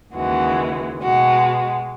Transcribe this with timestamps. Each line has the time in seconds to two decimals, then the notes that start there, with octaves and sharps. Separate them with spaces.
0.14 D#2 C#3 E3 G#3 F#4
1.02 B2 G#3 F#4